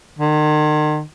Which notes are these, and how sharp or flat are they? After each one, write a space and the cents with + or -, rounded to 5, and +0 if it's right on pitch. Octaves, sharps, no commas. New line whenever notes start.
D#3 -40